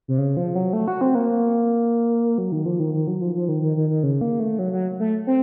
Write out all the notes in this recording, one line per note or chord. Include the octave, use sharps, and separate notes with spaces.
C3
C#3
F3
F#3
A3
F#4
C4
A#3
F#3
D#3
F3
D#3
D#3
F#3
F3
F3
D#3
D#3
D#3
D#3
C#3
A#3
A3
F#3
F#3
A3
C4